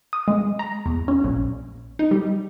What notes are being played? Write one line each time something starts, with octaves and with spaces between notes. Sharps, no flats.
D#6
G#3
A#5
E2
C#4
A#1
D#4
G3